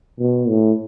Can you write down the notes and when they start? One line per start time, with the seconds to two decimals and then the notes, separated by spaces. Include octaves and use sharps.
0.19 B2
0.48 A2